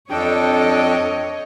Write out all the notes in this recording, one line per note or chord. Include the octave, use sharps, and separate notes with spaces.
F2 D4 A4 C#5 D#5 G5